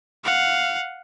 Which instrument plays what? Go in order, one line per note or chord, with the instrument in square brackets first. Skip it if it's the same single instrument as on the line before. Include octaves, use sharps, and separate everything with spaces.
[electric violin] F5 F#5